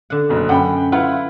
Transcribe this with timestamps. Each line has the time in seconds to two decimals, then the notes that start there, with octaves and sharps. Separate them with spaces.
0.10 D3 F#5
0.29 F#1 B2
0.49 F#2 F#5 G5 B5
0.92 E4 F4 B4 F#5